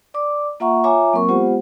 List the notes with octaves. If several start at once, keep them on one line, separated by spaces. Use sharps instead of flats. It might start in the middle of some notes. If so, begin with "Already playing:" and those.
D5 D6
A#3 F4 E5 F#5 A#5 C#6
F4 C#5 E5 G#5 A#5 D6
F#3 A#3 C4 A#4 C#6
G#3 B3 F4 G4 C5 F#5